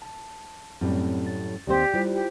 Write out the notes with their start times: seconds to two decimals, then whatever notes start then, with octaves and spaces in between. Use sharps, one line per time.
0.02 A5
0.81 F#2 A2 G3 C4
1.26 A6
1.67 D#2 C4 G4 C5 D5
1.94 G3 E4 F4 C5
2.12 G4